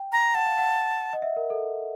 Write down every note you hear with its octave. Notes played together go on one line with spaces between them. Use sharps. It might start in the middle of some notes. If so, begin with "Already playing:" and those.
Already playing: G5
A#5
F#5 A5
F5
F#5
D#5
E5
A#4
A4